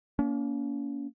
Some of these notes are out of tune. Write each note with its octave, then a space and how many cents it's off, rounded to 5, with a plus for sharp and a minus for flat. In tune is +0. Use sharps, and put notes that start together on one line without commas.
A#3 +10 C#4 +40